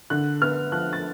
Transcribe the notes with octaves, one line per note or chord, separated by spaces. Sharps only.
D3 F#6
B3 F6
F3 F#6
A6